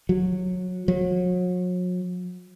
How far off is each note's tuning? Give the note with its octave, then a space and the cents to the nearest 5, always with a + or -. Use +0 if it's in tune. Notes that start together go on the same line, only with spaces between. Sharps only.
F#3 -20
F#3 -40